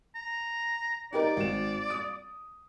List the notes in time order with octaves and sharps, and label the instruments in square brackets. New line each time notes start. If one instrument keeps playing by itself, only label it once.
[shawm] A#5
[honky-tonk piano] D#4 G4 A#4 [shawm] D5
[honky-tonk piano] G#1 E7
D#6